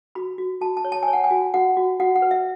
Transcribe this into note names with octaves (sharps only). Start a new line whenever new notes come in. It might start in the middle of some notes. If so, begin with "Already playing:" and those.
F#4 B5
F#4
F#4 A5
A5
C#5
A5
G#5
C#5
F#5
G#5
F#4
F#4 F#5
F#4
F#4 F#5
F#5
B4
E5